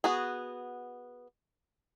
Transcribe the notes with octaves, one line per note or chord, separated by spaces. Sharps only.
B3 F#4 G#4